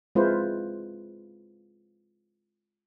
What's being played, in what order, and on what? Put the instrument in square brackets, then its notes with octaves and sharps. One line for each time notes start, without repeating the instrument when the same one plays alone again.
[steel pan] G#3 C4 E4 F4 B4 C5